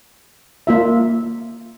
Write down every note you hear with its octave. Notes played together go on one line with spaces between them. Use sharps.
A#3 F4 E5